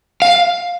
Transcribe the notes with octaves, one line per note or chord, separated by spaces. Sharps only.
F5